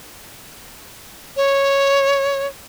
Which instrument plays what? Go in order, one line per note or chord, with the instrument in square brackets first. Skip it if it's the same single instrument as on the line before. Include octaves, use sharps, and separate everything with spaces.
[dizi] C#5